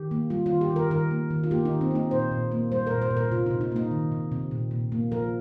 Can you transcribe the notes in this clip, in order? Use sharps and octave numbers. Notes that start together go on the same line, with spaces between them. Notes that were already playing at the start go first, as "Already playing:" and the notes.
Already playing: D#3 G4
A#3
G3 F4
F4
D#3
G4
D#3
A#4
D#3 A#4
A#3
D#3
F4
A#3 G4
D#4
D#3
C4
A#3 D#4
A#2 C5
A#2
A#3
G3 C5
A#2 A#4
C5
A#2
A#4
C3 F4
C3 D#4
D#4
A#3 D#4
D#3
C3
C3
A#2
A#2
A#3
F3 A#4